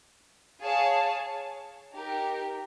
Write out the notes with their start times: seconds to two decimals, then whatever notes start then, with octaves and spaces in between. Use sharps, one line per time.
0.61 G#4 C#5 F5 A5
1.94 D#4 G4 A#4